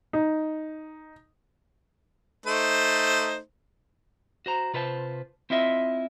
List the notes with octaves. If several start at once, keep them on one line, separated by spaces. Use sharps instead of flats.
D#4
A3 D#4 C5
F#4 C5 A#5
C3 F4 B4 C5 F5 A5
C4 E4 F4 D#5 E5